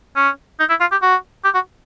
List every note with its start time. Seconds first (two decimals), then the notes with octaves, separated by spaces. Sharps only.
0.16 C#4
0.60 D#4
0.69 E4
0.80 F4
0.92 G4
1.02 F#4
1.44 G4
1.54 F#4